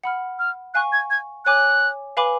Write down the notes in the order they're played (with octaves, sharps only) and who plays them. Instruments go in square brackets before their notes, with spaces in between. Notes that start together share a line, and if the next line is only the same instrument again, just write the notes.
[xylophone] F#5 B5 F6
[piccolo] F6
[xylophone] F5 G#5 C#6 [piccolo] F#6
[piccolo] G#6
G#6
[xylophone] C#5 G#5 D6 [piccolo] F#6
[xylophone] B4 F5 G#5 B5 D6